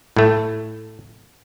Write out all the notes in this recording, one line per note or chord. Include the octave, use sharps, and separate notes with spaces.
A2 A3